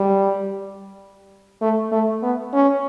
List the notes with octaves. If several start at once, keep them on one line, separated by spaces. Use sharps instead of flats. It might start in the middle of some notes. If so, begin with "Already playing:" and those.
Already playing: G3
A3
A3
B3
C#4